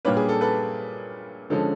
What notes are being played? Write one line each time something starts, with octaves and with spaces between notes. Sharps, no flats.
A#2 G3 A#3 D4 B4 C#5
G#4
A4
A4 B4
D3 F3 G#3 C#4 A4